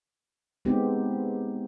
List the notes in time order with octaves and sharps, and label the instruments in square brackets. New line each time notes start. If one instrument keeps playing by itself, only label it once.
[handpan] G#3 B3 C4 D#4 G4